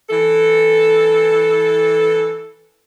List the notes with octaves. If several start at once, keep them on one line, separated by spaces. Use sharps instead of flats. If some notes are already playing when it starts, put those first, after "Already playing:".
E3 A4